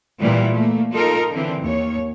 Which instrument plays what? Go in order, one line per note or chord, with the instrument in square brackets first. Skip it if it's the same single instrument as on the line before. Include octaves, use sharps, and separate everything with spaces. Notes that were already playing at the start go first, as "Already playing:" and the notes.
[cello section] A#2 E3 G3
A3 A#3
D#4 F4 A4 A#4
D3 E3 C4
D#2 C#5